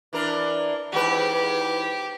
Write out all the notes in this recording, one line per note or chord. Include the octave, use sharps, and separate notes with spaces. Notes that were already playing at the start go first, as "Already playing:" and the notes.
E3 D4 A#4
E2 G#2 G4 B4